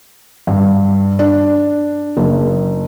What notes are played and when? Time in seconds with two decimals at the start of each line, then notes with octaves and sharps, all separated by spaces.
0.47 G2
1.19 D4
2.17 F#1